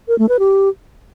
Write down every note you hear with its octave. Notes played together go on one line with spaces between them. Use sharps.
A#4
A3
B4
G4